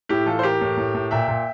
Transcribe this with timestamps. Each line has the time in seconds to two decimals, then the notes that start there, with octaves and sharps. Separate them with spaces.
0.09 A2 E4 G4
0.26 E3 F4 A4
0.39 C5
0.43 E3 G4 A#4
0.61 A2
0.77 A2
0.94 A2
1.11 A#2 E5 G5
1.28 A#2